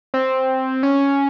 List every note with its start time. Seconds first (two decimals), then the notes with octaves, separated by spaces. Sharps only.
0.14 C4
0.83 C#4